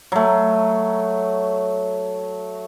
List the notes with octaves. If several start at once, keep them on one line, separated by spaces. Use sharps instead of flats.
F#3 A3